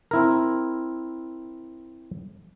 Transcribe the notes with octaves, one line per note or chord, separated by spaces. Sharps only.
C4 E4 A#4